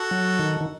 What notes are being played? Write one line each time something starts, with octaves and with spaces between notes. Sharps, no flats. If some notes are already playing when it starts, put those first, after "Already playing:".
Already playing: F#4 A4
F#3
D#3
D#3